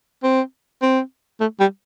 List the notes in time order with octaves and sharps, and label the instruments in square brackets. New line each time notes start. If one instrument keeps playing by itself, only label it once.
[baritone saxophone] C4
C4
A3
G3